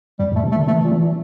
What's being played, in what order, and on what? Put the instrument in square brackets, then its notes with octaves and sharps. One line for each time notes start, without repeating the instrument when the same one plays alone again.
[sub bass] F2 [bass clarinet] G3
[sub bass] A2
[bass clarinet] A3
[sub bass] C3
[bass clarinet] A3
[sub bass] D3
[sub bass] E3 [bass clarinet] A3
[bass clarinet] A#2
[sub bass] E3
[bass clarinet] A#2